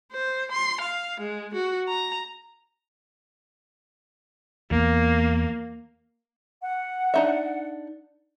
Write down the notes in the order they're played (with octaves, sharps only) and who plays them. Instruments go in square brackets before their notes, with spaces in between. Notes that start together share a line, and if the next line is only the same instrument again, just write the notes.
[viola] C5
C6
F5
G#3
F#4
A#5
[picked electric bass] E2 [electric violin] A#3
[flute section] F#5
[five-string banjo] D4 D#4 E5